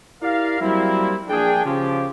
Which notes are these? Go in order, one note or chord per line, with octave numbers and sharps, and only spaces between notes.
E4 G4 A#4 D5 F5
F#3 G3 A#3 C4 E4
A#1 D4 G#4 G5
C#3 F3 G4